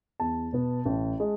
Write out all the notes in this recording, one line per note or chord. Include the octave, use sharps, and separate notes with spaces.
E2 A5
B2 B3
A1
G#3